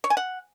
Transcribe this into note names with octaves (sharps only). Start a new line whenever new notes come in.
C#5
G#5
F#5